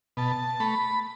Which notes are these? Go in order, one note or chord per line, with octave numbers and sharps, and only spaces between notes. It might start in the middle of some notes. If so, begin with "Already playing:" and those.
B2 A5
A3 B5